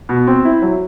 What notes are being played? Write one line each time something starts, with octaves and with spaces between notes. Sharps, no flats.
B2
C4
E4
F#3